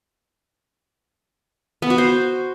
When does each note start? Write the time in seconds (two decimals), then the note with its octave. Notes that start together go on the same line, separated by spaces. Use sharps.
1.82 B3
1.90 F#4
1.98 C5